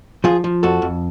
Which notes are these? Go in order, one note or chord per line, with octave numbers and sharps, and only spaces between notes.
F3 F4 G#4
F3
F2 F#4 A4
F2